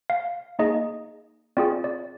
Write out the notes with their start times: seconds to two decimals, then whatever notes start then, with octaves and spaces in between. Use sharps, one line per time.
0.10 F5
0.59 A#3 D#4 G#4 D#5
1.57 C4 F4 G#4 D5
1.84 D5